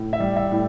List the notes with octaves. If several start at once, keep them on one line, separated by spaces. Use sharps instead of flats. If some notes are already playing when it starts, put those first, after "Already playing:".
Already playing: A2
E5
G3
E5
A2